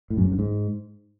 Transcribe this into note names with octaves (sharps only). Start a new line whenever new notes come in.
A2
F#2
G#2
G2
G#2